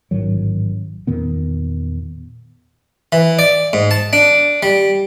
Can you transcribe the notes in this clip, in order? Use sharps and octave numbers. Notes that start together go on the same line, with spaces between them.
A1 G#2 D#3 F#3
E2 A#2 D#3 B3
E3
D5
G#2
A5
D4
G3